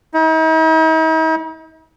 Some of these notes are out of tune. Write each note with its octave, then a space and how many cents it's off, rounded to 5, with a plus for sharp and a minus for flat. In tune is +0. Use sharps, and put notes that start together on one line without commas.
D#4 +45